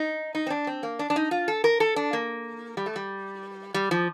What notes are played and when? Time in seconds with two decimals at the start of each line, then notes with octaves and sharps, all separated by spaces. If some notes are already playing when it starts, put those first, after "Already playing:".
Already playing: D#4
0.35 D#4
0.47 C4
0.50 D4
0.67 C4
0.83 A#3
0.99 D4
1.10 D4
1.16 D#4
1.31 F4
1.48 A4
1.64 A#4
1.80 A4
1.96 D4
2.13 A#3
2.77 G3
2.86 A3
2.96 G3
3.74 G3
3.91 F3